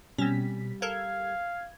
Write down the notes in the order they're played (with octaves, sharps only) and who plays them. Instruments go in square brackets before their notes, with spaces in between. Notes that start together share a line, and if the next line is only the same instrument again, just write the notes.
[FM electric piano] B2 B6 [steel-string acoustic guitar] G3 [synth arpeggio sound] C4 C#4
[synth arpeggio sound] A4 A#4 [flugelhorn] F5 [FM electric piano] G#6